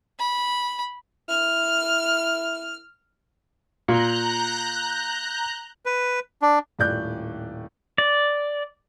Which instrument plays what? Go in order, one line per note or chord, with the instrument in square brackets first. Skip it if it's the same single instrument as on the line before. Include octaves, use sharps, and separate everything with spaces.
[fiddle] B5
[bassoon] E4 [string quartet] F6
[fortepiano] A#2 [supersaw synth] A#5 F#6 G6
[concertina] B4
D4
[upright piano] D#1 A2 D5 F#6 G6
[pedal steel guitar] D5